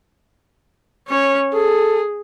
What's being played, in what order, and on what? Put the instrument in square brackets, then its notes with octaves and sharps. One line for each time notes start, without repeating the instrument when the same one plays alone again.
[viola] C#4 C#5
[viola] G#4 [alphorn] A4